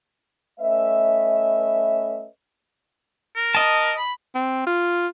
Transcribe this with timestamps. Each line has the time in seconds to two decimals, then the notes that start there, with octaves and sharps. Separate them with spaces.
0.60 A3 C#4 B4 D#5 E5
3.36 A#4
3.55 D#5 A5
3.98 B5
4.35 C4
4.67 F4